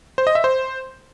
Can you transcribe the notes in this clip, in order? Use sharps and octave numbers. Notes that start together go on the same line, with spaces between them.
C5
D#5
E5
C5